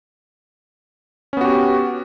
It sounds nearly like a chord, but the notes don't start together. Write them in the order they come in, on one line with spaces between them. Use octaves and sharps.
C#4 B3 F#4 G4